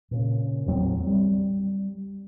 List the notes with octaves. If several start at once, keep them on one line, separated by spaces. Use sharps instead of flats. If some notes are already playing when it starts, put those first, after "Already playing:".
A#2 C#3
A1 E2 F#3 C4
G3